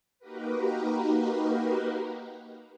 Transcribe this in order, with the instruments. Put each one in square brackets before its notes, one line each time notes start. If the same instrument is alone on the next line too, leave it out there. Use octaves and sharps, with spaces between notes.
[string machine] A#3 D#4 F#4 G4 A#4 B4